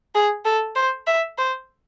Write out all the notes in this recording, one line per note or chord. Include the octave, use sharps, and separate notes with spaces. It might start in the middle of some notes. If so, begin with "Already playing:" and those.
G#4
A4
C5
E5
C5